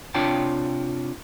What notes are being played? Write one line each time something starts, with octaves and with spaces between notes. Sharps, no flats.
C3 D4 F4 C#5 G5 A5